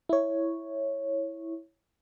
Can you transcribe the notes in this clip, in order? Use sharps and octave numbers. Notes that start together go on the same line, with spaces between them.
E4 C#5